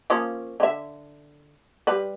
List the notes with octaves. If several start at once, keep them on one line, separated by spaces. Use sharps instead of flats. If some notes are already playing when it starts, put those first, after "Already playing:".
F3 A#3 C#4
D3 E5
G3 B4